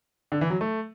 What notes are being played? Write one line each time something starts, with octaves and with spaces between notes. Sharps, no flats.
D3
E3
F#3
A3